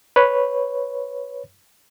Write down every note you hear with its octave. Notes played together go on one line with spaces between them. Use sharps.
B4 C#5